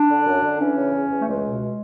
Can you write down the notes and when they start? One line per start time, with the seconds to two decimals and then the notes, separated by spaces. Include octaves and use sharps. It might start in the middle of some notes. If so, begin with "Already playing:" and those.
Already playing: D4
0.09 D3
0.26 F#2
0.43 D3
0.59 E3 C#4
0.77 C#3
0.94 E2
1.10 E2
1.22 A3
1.27 C#2 G#3
1.44 B2